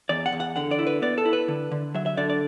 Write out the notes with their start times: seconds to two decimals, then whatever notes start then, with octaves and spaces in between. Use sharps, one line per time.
0.09 E2 D5
0.26 F#5
0.32 E2
0.40 F#5
0.56 D3 F#5
0.71 D5
0.79 E4
0.87 B4
1.02 B3 D5
1.18 A4
1.25 E4
1.33 B4
1.48 D3
1.71 D3
1.94 F#3 E5
2.06 E5
2.17 D3 D5
2.30 D5